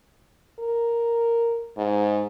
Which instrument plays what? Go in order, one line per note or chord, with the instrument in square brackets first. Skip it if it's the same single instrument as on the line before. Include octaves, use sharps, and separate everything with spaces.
[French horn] A#4
G#2